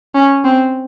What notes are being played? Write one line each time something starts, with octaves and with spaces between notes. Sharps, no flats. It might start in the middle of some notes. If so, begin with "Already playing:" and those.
C#4
C4